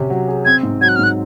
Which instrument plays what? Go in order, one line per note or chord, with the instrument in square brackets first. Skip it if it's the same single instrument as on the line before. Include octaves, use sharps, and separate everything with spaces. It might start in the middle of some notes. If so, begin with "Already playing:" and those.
Already playing: [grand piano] C3 C#4
F#3
G#4
[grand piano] C4 [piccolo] G#6
[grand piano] G#2
[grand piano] F#3 [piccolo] G#6
[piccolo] F#6
F6
[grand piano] G#2 [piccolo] F#6